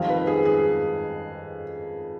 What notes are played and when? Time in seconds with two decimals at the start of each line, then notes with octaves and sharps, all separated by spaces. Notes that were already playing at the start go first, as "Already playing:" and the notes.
Already playing: F2 D#3 G3 F5
0.09 B4
0.27 G#4
0.45 G#4